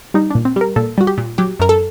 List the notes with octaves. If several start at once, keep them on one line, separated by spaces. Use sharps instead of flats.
G3 D#4
A#2 D4
C4
G3 A#4
A#2 A4
G3 F#4
G4
A#2
F#3 G4
F#2 A#4
A4